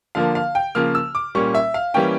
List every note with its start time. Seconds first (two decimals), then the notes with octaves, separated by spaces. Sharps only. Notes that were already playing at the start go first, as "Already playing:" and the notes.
0.15 D3 F3 A#3 F5
0.35 F5
0.55 G5
0.75 C#3 F3 A#3 F6
0.95 E6
1.15 D6
1.35 A#2 G3 A#3 C#4 C#6
1.55 E5
1.74 F5
1.94 E3 G3 A#3 C#4 G5